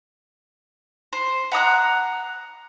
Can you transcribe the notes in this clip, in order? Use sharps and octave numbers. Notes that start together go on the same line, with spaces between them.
C5
F#5 A#5 D#6 F#6